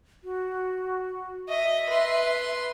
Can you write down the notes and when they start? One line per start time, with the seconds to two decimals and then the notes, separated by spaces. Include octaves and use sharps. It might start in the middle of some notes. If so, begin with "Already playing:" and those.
0.24 F#4
1.49 D#5 E5
1.89 B4 C6